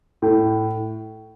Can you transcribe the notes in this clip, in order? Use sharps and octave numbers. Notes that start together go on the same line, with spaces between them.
A2